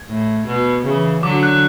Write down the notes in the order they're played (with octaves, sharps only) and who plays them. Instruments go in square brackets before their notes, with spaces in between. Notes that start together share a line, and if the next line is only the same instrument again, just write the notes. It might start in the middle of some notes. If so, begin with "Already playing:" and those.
Already playing: [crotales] G#6
[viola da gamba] A2
B2
C#3 E3
[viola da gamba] D3 F#3 [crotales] D6
[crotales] F#6